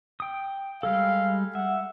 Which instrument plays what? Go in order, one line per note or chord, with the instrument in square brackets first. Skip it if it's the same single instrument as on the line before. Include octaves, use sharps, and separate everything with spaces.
[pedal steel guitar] G5 D#6
[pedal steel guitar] G3 G#3 A4 [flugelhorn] F5
[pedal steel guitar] E5 [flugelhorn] F#5